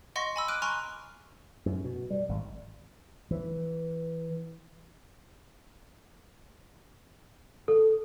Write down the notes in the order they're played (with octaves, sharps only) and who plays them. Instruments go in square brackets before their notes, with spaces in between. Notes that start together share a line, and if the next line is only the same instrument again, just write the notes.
[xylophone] D#5 F#5 C6 C#6 A#6
G#5 B5 E6
D6 F6 F#6 D7 D#7
G#5 A#5 C6 C#6 F6 F#6
[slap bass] F#2
B2
G3
G#1
E3
[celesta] A4